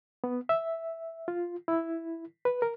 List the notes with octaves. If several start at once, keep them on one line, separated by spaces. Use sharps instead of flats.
B3
E5
F4
E4
B4
A#4